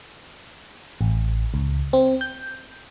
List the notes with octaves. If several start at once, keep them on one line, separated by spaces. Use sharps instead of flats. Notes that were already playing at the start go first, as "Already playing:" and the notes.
A1
C#2
C4
G6